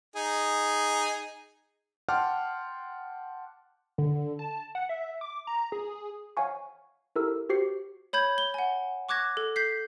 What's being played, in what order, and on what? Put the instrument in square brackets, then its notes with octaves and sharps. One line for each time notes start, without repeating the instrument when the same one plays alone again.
[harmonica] D#4 G#4
[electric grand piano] F#5 G5 A5 C6 D6 F6
[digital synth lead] D3
A5
F#5
E5
D6
A#5
G#4
[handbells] C#5 F5 F#5 G#5 C#6
E4 G4 A4 A#4 E6
F#4 G4 C5 C7 C#7
[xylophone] C#5 B5 G6 G#6
G7
F#5 G#5
C#6 D6 F#6 G#6 A#6
A4
G6 B6 C7